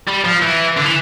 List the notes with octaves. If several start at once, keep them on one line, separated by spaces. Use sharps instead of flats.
G3
F3
E3
D3
E3